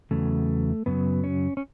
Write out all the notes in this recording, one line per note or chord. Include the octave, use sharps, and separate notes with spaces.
E2 C#3 F#3 A3
F#2 C#3 F#3 B3
C#4
C#4